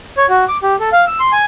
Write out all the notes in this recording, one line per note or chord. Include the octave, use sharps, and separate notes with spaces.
C#5
F#4
D6
G4
A4
F5
E6
C6
G#5